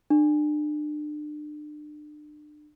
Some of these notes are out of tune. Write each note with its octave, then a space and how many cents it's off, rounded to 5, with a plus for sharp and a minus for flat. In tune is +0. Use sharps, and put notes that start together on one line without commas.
D4 +35